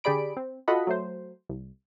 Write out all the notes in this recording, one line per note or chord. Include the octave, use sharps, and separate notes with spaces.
D3 G4 G#4 D5 B5 D7
C4
F4 F#4 A4 D#5 F#5 B5
F#3 A3 C5
C2